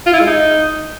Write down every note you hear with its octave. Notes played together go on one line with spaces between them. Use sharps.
F4
E4
G#3
D#4